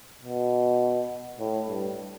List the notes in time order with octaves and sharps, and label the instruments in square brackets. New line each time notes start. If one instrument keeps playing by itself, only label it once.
[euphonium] B2
A2
G2